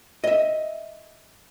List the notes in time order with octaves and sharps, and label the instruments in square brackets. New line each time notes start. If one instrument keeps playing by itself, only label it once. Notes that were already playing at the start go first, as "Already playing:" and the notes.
[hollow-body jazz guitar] D#5 E5